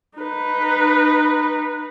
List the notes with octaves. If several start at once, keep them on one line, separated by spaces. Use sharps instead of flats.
D#4 B4